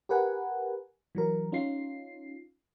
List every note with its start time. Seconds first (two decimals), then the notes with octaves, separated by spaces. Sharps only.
0.09 G4 A#4 B4 F#5 G#5
1.15 E3 F#3 A#4
1.52 C#4 D#4 F4 C7